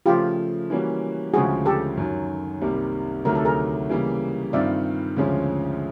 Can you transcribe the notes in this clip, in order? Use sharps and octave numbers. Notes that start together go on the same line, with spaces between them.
C#3 F3 A3 F4 G4
E3 G3 A#3 C#4 F#4
D2 C#3 F3 G#3 F#4 G#4
G4 A4
F#2 D#3 F#3
C2 C3 D#3 G3 A#3
D2 C3 D#3 F#3 A3 A#4
A4
G#4 A#4
C#3 E3 G3 A#3
G2 D#3 G3 C4 F4 D5 E5
D2 C#3 F3 G#3 C#4